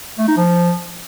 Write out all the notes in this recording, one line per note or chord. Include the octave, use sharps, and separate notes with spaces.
A3
D#4
F3